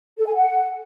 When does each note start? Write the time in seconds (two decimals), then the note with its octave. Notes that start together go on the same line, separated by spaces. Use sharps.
0.18 A4
0.27 G#5
0.35 F#5